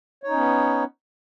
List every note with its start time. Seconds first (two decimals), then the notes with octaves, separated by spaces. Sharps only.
0.23 C#5
0.27 D#4
0.31 C#4
0.35 B3